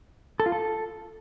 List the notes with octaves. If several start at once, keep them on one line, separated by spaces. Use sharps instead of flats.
A4
F4
A4